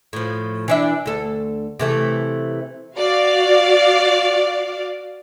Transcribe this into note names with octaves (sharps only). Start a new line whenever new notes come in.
A2 F3
E3 D4 E5
D2 A4
C3 E3 A3
F#4 D5 F5